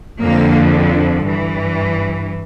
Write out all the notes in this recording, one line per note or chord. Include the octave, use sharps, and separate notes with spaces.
F2 D3 F3 A#3
G2 E3